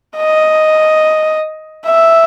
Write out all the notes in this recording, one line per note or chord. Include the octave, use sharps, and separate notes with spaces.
D#5
E5